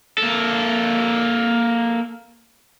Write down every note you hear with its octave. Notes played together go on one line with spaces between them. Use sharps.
A#3 A4